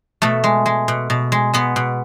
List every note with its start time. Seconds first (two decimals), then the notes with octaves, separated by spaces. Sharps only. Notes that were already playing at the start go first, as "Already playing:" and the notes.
0.22 B2 A3
0.44 G#3
0.66 G#3
0.88 B2
1.10 B2
1.32 G#3
1.53 G#3 B3
1.76 B2